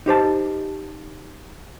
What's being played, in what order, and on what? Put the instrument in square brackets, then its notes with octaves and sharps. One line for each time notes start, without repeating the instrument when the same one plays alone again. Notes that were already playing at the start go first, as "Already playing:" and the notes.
[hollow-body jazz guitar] D#4 G4 C5 A5